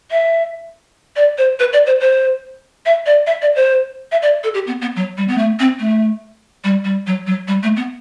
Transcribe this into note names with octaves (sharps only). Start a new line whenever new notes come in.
E5
D5
C5
B4
D5
C5
C5
E5
D5
E5
D5
C5
E5
D5
A4
G4
B3
B3
F#3
G3
B3
A3
C4
A3
G3
G3
F#3
F#3
G3
A3
B3